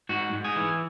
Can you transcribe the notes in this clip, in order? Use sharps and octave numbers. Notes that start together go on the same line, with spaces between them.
G#2 F#4
G#2
G#4
E3